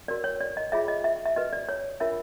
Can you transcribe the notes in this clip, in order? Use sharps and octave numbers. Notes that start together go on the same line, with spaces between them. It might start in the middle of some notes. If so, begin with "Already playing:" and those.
F#4 A#4 C#5 D5
C#5
D5
D#5
F4 G#4 C#5 E5
D#5
E5
E5
F#4 B4 D#5
D5
C#5
D4 F4 A#4 C#5 E5